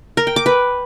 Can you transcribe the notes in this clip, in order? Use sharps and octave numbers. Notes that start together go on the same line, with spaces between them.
A#4
G5
D6
B4